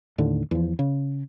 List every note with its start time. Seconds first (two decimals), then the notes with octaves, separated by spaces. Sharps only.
0.18 D#2 A2 D3
0.51 E2 F3
0.79 C#3